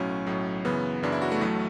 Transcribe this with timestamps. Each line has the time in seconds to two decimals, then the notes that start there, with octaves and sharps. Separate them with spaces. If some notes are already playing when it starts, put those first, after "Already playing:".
Already playing: B1 A2 F#3 C#4
0.27 B1 A2 F#3
0.65 F#2 C#3 E3 B3
1.03 F#2 C#3 E3 D4
1.12 E4
1.22 F#4
1.32 A3
1.41 A1 A2 F#3